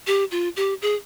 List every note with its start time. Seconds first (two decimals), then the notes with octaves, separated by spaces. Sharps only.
0.07 G4
0.31 F4
0.56 G4
0.82 G#4